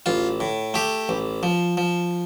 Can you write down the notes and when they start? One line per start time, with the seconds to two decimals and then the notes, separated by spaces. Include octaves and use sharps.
0.06 A1 F4
0.40 A2
0.74 A3 G4
1.09 A1
1.43 F3
1.77 F3